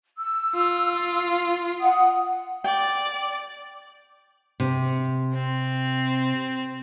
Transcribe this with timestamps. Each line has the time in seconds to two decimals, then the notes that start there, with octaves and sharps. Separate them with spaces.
0.18 E6
0.56 F4
1.80 F#5 D#6
2.64 D5 G5
4.60 C3
5.34 C4